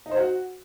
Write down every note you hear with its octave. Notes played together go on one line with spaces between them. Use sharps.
D#4
C5
F#4